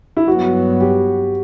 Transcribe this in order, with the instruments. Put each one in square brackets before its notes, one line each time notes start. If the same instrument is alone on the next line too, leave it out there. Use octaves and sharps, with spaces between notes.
[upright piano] E4
[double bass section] G2 F#3 B3 [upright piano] F#4
[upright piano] G4